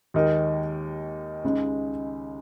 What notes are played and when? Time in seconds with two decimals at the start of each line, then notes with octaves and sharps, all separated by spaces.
0.14 D#2 D#3 G#3 D#4 A#4
1.44 C#2 C#3 G#3 D#4